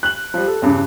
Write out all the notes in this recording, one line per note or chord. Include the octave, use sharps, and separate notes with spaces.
F#6 F#7
F3 G3
A4
E2 G2 C#3